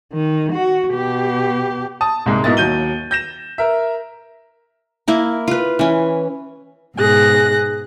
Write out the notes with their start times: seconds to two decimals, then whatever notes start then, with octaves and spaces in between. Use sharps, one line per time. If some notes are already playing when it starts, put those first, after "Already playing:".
0.13 D#3
0.52 F#4
0.91 B2 G4
2.01 A5 D#6
2.26 C2 G#2 G#3
2.44 G#2 B2 A#3 E4 D#5 A6
2.57 D#2 F#3 G6 D#7 G7
3.11 G6 A#6 E7
3.58 A#4 E5
5.08 A#3 E4 A#4
5.48 F4 B4
5.79 E3 C#4
6.96 G#2 B2 G#4 F#6 A#6